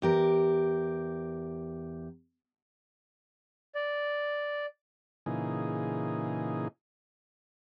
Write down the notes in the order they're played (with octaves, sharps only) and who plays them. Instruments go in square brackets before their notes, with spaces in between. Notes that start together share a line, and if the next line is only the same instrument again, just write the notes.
[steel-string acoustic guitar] E2 G4 A#4
[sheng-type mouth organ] D5
[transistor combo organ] A#2 C#3 E3 D#4 G#4